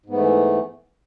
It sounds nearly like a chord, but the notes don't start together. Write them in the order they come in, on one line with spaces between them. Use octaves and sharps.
G#2 B3 A3 E3